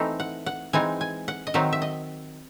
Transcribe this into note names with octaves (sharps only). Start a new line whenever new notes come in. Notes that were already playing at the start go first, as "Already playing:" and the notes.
Already playing: E3 A3 C4 D#4 E5
F#5
F#5
E3 G#3 C4 D#4 G#5
G#5
F#5
D#5
D#3 F#3 C4 D#4 E5
E5
D#5